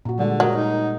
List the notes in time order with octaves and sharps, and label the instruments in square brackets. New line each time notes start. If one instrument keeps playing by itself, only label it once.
[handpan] A#2 F#4
[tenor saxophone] D3 [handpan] G3 G#3
[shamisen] F#3 [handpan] A#4 D#5
[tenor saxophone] D#4